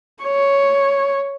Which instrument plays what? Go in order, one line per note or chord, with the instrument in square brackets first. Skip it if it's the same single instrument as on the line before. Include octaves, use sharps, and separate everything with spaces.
[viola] C#5